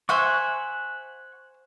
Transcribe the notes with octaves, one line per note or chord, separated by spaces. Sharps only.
C5 E5 F#5 G#5 C#6